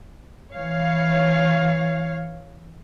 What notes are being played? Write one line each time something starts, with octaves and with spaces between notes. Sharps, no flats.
E3 C#5 F5